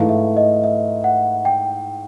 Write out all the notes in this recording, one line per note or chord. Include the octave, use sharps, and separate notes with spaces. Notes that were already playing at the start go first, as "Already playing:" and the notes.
Already playing: G#2 E3 A3 F5
E5
D#5
E5
F#5
G5